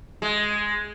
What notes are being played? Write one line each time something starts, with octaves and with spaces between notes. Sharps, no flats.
G#3